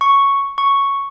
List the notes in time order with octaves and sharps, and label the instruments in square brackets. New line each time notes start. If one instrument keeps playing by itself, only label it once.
[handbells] C#6
C#6